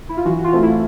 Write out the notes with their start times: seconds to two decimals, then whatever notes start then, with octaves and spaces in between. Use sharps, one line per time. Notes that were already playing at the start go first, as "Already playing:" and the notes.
0.09 E4
0.17 F4
0.25 E3 F#4
0.39 F#4
0.44 F4
0.53 A3 C4
0.63 E4